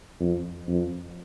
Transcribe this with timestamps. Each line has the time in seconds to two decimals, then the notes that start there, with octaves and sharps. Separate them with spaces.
0.20 F2
0.68 F2